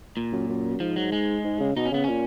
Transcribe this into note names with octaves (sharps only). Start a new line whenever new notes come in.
A#2
F#2
F#2
G#2 F3
F#3
G#3
G#2
C#3
B2 D#4
C#4
C#3 B3
A#2 C#4